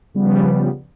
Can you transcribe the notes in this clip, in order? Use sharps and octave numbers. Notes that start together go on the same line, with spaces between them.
C#3 F3 G3 B3